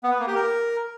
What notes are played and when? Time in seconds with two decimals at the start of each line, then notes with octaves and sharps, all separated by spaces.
0.03 B3
0.11 B4
0.19 A#3
0.27 G4
0.35 A#4